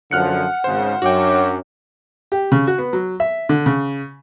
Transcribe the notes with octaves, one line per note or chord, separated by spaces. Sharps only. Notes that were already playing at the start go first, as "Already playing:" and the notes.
F#2 D3 F3 F#5 F6 F#6 C#7
G#1 C#3 C5
F#2 D4 F#4 C#5 G5 D6
G4
C#3
F#4
B3
F#3
E5
D3
C#3